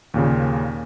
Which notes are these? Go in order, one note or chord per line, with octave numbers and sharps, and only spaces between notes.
D#2 A#2 C#3